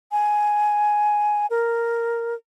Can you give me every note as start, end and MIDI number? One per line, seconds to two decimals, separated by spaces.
0.12 1.46 80
1.50 2.34 70